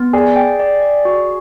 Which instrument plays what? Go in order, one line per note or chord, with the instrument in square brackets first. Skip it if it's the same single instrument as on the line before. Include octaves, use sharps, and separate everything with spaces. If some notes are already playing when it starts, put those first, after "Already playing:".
Already playing: [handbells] B3
[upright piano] G#4 [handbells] D5
[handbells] G5
D5
D5
F#4